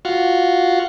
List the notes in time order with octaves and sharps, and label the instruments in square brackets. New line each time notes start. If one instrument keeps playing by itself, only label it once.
[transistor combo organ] F4 F#4